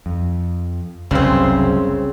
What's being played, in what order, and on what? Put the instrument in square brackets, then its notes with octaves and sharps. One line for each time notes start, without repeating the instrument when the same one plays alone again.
[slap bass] F2
[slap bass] F#1 C2 [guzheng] C#3 C4